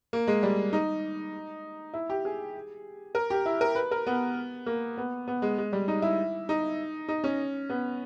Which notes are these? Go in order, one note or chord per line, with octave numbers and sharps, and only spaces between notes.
A#3
G#3
G3
D#4
E4
G4
G#4
A#4
G4
E4
A#4
B4
A#4
B3
A#3
B3
B3
G#3
G#3
G3
D#4
E4
D#4
D#4
C#4
B3